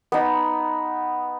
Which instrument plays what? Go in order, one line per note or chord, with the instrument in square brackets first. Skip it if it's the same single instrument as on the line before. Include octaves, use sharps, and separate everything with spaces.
[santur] B3 D#4